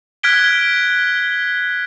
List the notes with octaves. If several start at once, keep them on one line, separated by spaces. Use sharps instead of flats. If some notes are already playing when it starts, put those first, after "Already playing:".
F6 F#6 G#6 B6 D7 G7